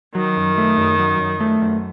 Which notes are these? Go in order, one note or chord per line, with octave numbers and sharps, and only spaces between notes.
D#3 F#3
F#2
A3
F#2
F#3
F#2
A3
F#2